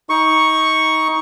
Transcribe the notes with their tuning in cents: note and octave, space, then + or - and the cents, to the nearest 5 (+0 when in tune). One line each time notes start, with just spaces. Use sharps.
D#4 +25 C#6 +0